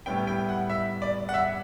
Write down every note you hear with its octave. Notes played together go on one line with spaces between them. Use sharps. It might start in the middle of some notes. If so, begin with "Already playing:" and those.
A2 G3 B3 E4 G5
G5
F#5
E5
D5
F#5
E5